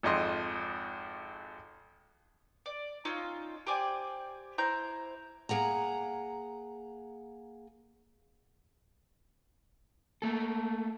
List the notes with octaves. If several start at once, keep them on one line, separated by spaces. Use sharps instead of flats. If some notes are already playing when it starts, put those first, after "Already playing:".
G#1 F2 D#5 C6
D5
C#4 D#4 F4 E6
G4 C5 D5 G#5
E4 C5 A#5 G6
A#3 G#4 F#5 A#5
A3 A#3 A4